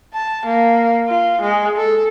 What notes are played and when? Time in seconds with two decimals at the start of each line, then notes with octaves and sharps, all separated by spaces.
0.14 A5
0.46 A#3
1.08 F4
1.41 G#3
1.77 A4